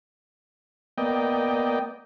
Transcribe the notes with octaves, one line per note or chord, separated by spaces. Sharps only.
A#3 B3 D5 D#5 G5